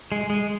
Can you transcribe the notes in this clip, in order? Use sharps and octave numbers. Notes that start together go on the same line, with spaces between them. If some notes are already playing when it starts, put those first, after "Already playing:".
G#3
G#3